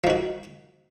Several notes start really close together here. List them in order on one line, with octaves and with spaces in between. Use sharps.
F3 D#3 F#4